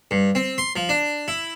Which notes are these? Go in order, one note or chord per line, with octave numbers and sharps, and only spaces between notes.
G2
C4
C6
F3
D4
E4